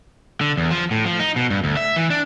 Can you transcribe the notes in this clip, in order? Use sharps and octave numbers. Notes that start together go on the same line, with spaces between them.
D3
E2
F3
A2
F3
D#4
B2
G2
D2
E5
E3
D4